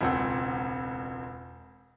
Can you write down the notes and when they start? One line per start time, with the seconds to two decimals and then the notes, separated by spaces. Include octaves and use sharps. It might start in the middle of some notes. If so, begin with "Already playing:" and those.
0.01 E1 C#2 C4 F#5 E6